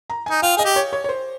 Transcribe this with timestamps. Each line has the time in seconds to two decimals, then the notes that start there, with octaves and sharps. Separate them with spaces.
0.10 A#5
0.26 D#4 G#5
0.43 F4 G5
0.57 G#4 D#5
0.65 G4
0.76 C#5
0.93 C#5
1.04 C#5
1.09 C5